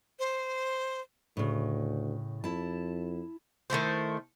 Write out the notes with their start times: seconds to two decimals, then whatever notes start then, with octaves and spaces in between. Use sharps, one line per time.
0.19 C5
1.37 D2 A2 C#3
2.44 F2 E4 A5
3.70 D#3 A3 E4 C5